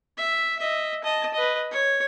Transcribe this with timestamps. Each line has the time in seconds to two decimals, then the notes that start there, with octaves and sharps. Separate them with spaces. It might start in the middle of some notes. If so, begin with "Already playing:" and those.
0.18 E5
0.59 D#5 E5
1.04 D#5 A5
1.33 B4 D#5
1.71 C#5